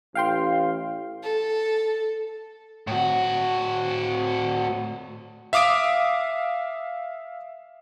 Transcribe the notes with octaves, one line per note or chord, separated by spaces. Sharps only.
A1 F5 G5 C6
A4
A2 F#4
E5 F5 D6 D#6 D7